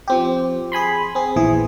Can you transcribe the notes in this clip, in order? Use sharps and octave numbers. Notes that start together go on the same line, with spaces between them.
F3 C4 G4
G#4 G#5 B5 C6
C4 G#4
A#1 E2 E3 G#4